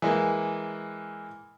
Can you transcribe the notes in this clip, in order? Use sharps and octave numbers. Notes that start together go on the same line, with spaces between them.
E3 G#3 A#3